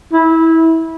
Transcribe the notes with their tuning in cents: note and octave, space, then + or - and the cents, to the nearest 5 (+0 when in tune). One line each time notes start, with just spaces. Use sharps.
E4 -20